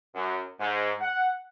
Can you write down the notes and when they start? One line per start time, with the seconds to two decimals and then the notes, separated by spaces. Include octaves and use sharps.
0.15 F#2
0.60 G#2
1.01 F#5